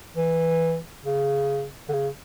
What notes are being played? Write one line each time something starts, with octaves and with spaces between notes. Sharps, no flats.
E3
C#3
D3
C#3